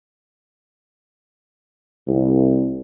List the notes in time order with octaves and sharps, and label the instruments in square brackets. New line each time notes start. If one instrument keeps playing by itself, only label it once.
[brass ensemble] C2